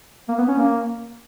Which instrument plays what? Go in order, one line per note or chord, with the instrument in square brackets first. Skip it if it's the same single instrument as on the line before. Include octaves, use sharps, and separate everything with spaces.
[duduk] A#3
B3
C#4
A#3